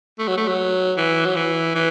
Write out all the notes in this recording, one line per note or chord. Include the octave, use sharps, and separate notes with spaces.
A3
F#3
A3
F#3
E3
F#3
E3
E3